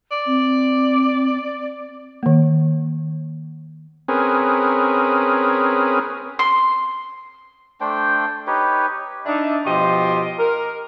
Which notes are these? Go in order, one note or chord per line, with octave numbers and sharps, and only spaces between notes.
D5
C4
D#3 A#3
C4 C#4 G#4 A#4 B4
C6
A3 D4 C5 G5
D#4 G4 B4 C#5
D4 D#4 E5
B2 F3 G4 D#5 C6
A#4